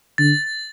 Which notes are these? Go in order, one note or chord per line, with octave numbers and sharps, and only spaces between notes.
D3 A6